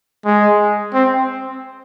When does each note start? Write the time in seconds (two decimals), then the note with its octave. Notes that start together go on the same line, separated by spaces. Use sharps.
0.25 G#3
0.93 C4